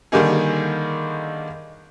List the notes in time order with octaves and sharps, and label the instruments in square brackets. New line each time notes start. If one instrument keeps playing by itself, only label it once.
[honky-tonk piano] D3 D#3 G3 A#3 D#4 G#4